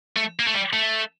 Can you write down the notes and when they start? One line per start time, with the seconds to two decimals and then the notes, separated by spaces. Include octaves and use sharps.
0.16 A3
0.39 A#3
0.47 A3
0.54 G3
0.73 A3